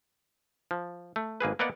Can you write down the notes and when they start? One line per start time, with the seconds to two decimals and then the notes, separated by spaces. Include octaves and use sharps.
0.71 F3
1.16 A3
1.41 G#1 A#3 G#4 B4
1.59 A#3 B3 A#4 D5 D#5 F#5